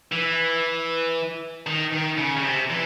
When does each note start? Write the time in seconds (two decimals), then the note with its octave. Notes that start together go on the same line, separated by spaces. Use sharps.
0.12 E3
1.67 D#3
1.92 D#3
2.18 C#3
2.37 C#3
2.44 C3
2.70 E3